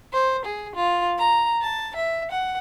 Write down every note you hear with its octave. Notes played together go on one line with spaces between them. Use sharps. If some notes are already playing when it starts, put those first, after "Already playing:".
C5
G#4
F4
A#5
A5
E5
F#5